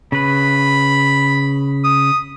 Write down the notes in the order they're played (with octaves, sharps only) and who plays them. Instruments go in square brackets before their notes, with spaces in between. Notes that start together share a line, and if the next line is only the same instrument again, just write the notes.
[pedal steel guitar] C#3 B4 [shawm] B5
[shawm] D#6